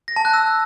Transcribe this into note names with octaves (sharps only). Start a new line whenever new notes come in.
A#6
A5
F#6
E6